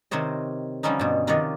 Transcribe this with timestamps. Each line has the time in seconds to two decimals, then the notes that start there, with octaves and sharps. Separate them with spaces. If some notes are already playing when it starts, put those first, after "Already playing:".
0.11 C3 D#3 C5 C#5 D#5
0.83 D3 F3 G3 C4 C#4 D#4
0.99 G2 B2
1.27 C3 D#3 F3 D4 C#5 D#5